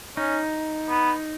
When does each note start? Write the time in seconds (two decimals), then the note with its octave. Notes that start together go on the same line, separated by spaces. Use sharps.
0.17 C#4 D#4
0.89 B3